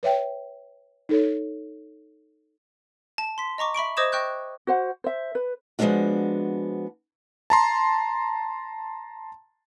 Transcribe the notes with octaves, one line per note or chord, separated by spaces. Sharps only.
B4 C#5 E5 G5
D#4 A4 C#5
A5
C6 B6
D#5 A#5 C#6 D6
E5 B5 C#6 D7
C5 D#5 D6 D#6 G#6 E7
D#5 G5 C#6 F#6 G6
F#4 C5 F#5
C5 E5
B4
F3 G#3 A3 B3 D4 F#4
A5 A#5 C6